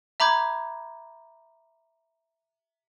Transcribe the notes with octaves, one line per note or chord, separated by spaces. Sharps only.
E5 A#5 B5 D6 G6 G#6